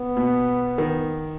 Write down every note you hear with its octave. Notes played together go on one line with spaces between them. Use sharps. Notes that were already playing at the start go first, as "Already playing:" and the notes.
Already playing: B3
B2
D#3